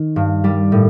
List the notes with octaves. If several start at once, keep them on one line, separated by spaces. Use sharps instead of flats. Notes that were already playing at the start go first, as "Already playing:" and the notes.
Already playing: D#3
G2
G3
A2